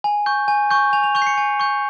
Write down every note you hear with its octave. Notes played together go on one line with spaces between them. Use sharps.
G#5
C#6 G6
G#5
C#6 G6
G#5 F7
F7
C#6 G6 F7
C7
C#7
G#5
C#6 G6